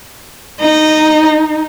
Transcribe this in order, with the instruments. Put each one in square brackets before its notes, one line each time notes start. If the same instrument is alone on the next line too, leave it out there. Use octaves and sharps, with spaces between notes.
[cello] D#4 [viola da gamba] D#5